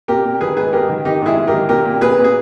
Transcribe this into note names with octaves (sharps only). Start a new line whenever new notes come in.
A#2 G4 A#4
A#2
D#3 G#4 B4
G#2 G#4 B4
G#2 G4 A#4
D#3
D#3 D#4 G4
G#2 E4 G#4
G#2
G4 A#4
D#3
A#2 G4 A#4
A#2
A#2 G#4 B4
A#2
G#4